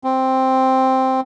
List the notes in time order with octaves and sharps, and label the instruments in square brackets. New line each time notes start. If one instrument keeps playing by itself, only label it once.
[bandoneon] C4